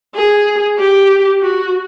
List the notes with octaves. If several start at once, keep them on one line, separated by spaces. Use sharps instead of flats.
G#4
G4
F#4